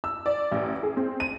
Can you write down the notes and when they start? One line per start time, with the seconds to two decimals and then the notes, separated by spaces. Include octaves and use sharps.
0.04 E6
0.26 D5
0.52 A1
0.83 G#4
0.97 C4
1.20 D#7